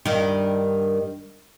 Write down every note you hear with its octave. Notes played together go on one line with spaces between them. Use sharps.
G2 D#3